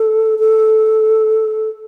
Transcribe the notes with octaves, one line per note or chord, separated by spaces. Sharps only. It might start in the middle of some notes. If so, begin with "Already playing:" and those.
Already playing: A4
A4